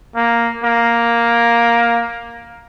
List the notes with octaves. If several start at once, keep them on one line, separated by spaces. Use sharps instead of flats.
A#3
A#3